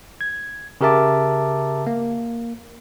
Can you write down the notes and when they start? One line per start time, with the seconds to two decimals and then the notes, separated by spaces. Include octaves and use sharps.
0.21 G#6
0.81 C#3 G4 A#4 E5 A5 D6
1.87 A#3